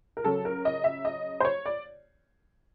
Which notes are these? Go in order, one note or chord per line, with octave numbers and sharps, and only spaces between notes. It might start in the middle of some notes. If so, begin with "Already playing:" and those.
A#4
C#3 F#3 A4
A#4
D#5
E5
D#5
C5
C#5
D5